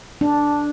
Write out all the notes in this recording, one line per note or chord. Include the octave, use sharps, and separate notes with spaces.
D4